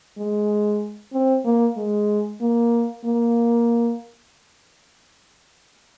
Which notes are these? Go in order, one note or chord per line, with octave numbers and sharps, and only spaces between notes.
G#3
C4
A#3
G#3
A#3
A#3